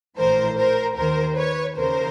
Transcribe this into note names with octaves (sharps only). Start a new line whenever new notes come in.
A#1 A2 E3 A#4 C5
A#4 C5
D#2 D#3 A#4 C5
B4 C#5
D#2 C#3 E3 A#4 C5